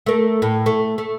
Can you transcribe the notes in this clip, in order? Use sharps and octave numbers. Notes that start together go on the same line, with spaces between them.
A3 A#4
A2
A3
A3